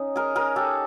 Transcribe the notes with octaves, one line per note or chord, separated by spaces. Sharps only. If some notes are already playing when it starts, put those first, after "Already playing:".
Already playing: C#4 D#4
G#4 A#4
G#4 A#4
G4 A4